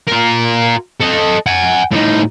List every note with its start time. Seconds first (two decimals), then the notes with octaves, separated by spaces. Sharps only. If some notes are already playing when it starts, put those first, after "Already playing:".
0.08 F4 A#4
1.00 A4 D#5
1.46 F#5 G#5
1.91 A2 D#4